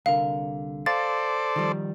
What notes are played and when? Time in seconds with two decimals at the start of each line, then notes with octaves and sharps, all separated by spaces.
0.06 C2 D3 A#4 F5
0.86 A4 C5 D5 F5 A6
1.56 D#3 F3 G3